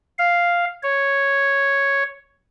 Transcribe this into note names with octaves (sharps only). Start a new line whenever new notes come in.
F5
C#5